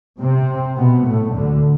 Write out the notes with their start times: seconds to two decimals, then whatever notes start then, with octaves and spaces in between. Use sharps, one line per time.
0.20 C3 C4
0.77 B2 B3
1.06 A2 A3
1.35 D2 D3